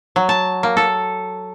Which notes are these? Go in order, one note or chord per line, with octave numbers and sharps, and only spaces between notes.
F#3
A5
A#3
A4